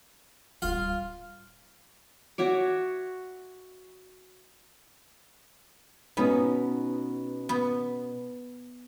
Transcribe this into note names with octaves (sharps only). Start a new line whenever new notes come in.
D1 G3 F4 F5
F#4 C#5 E5 D6
B2 B3 C#4 D#4
B3